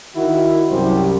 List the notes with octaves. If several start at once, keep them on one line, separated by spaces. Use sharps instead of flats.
D#3 E4 F#4
C2 F#2 F#3 E4 G4 C5